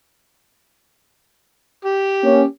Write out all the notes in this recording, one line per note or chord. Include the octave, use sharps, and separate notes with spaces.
G4
A#3 C#4